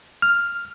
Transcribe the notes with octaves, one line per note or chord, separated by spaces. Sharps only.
F6